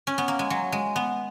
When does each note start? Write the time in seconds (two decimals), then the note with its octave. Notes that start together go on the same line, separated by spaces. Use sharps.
0.07 C#4
0.18 B3
0.28 A#3
0.39 G#3
0.50 F#3
0.72 G#3
0.96 B3